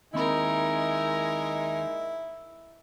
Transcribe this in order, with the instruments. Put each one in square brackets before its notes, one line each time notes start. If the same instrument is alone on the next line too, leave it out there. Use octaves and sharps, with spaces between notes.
[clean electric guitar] D#2 C4 B5 [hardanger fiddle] G#3 A#4 [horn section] D#4 [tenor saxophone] E4